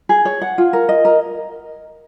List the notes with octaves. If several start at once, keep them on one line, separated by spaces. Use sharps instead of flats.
G#4
C#5
F#5
F4
A#4
D#5
A#4